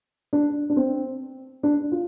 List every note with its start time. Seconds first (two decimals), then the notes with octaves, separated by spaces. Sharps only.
0.33 D4
0.70 D4
0.76 C4
1.63 D4
1.92 F4